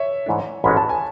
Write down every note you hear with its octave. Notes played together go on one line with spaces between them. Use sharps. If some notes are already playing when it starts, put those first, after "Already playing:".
Already playing: C#5 E5
G#2 E3 A3 D4
A1 G#2 G#3 C#4 F#4 B5
A5
G#5